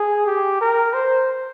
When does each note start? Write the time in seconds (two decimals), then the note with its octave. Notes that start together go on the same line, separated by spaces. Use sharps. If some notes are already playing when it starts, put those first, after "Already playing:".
Already playing: G#4
0.26 G4
0.61 A#4
0.94 C5